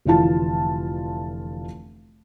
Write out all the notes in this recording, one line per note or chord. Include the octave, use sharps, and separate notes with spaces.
F1 D3 E3 F4 A5